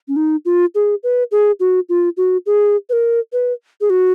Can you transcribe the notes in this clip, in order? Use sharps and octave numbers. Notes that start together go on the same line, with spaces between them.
C#4
D#4
F4
G#4
B4
G#4
F#4
F4
F#4
G#4
B4
A#4
B4
G#4
F#4